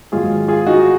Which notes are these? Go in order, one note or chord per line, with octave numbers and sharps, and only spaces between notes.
G#2 D#3 F#3 F4 G#4
F4 G#4
D#4 F#4